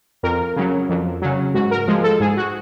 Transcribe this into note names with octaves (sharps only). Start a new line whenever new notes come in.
F2 A#4
C#3 F#3
F2
C#3 F#3
G#2 F#4
A#4
F3 G#3
A4
G#2 G#4
F#4